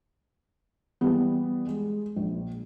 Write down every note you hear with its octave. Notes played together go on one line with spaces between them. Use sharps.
E3 G3 B3
G#3
A#1